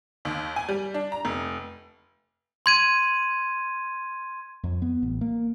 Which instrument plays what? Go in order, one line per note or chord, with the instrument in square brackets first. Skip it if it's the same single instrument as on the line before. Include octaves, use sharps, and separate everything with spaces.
[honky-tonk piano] D#2
G#5
G3
D4
A#5
F1
[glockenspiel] C6 G#6 D#7
[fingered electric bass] F2
B3
A1
A#3